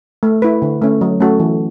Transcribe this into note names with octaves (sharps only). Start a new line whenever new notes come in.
A3
E4 B4
D3
A3 C#4
F#3
A3 C#4 F#4 A4
E3